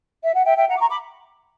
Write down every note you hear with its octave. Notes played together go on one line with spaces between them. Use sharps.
E5
F#5
E5 G5
E5 G5
F#5 A#5
D6
A#5 C#6
B5 D6